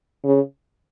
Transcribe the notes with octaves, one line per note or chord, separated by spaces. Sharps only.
C#3